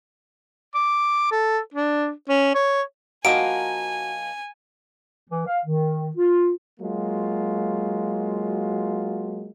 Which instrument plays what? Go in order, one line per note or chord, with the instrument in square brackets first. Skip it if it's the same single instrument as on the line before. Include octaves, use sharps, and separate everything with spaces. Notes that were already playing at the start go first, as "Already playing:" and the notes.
[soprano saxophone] D6
A4
D4
C#4
C#5
[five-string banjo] F3 A#3 D#4 [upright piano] F#4 [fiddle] G#5 [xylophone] D7
[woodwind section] E3
F5
D#3
F4
[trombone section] F#3 G#3 A#3 F4 F#4